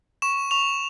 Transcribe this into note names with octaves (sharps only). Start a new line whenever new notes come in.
C#6 E7
C#6 F7